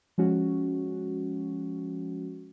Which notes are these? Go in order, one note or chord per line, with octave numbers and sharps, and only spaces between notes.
F3 G#3 C#4 F#4